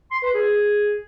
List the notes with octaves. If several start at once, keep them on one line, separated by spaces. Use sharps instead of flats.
C6
B4
G#4